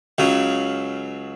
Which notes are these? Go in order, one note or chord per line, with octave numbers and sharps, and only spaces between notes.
C#2 C#3 F#3